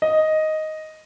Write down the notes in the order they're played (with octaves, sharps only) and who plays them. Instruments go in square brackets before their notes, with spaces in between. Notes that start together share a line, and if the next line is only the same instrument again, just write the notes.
[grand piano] D#5